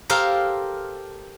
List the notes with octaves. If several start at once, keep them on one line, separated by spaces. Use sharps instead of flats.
G4 A4 A#4 C5 F5